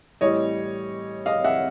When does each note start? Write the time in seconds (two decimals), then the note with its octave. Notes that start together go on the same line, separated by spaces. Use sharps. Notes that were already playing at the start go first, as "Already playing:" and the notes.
0.21 A2 E3 G3 C#5 D#5
1.26 D#5 F5
1.44 E5 F#5